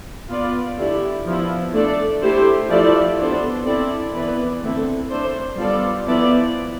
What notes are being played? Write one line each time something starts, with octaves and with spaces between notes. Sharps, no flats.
B3 F4 B4 D5
D3 A3 E4 G4 D5
F3 B3 E4
A3 D4 A4 D5
A3 E4 G4 C5
F3 A3 E4 G4 D5
B3 D4 A4 C5
C4 E4 A4 D5
E3 B3 E4 B4 D5
D3 A3 C4 E4 A4
A3 D4 A4 C5
G3 B3 F4 A4 D5
F3 B3 E4 B4 D5